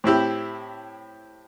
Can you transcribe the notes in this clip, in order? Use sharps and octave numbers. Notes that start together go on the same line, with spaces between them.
A2 C4 E4 G4